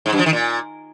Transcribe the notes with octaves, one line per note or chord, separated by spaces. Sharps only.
G#2
F#2
F3
D#3
A#2